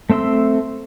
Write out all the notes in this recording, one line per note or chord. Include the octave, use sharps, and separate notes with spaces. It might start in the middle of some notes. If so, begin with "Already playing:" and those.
A3 C4 E5 C6 E6